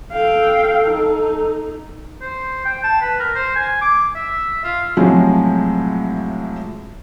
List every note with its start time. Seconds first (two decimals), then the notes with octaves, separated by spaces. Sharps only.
0.13 A4 F5 G5
0.86 D#4
2.22 C5
2.65 G5
2.84 A5
3.01 B4
3.20 A#4
3.35 C5
3.56 G#5
3.81 D6
4.15 E5
4.64 F4
4.97 A2 C3 F3 F#3 G#3